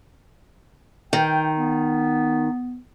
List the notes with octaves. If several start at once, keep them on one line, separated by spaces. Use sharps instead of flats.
D#3 G5
B3